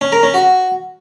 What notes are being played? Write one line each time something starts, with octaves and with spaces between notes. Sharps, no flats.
C#4
A#4
C#4
F#4